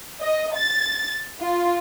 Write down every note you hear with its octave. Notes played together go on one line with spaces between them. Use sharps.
D#5
A6
F4